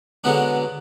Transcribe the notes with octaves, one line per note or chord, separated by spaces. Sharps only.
B2 D3 F#3 G#3 B3 D4